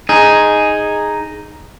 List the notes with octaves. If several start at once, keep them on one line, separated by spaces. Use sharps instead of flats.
D#4 G#4